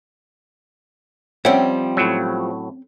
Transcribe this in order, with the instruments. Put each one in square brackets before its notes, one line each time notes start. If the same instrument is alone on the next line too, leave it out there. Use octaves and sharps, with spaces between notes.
[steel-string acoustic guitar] F3 G3 [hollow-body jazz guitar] C4 C#4 G5 [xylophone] C#5 E5 F#5
[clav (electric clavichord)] A2 F#3